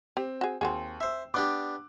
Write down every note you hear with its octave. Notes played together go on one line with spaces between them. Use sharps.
C4 G4
F#4 G#4
D#2 C4 F#4 G#4
C5 E5 E6
B3 D4 G4 D6 F#6